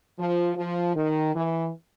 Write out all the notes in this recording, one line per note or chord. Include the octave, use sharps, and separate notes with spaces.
F3
F3
D#3
E3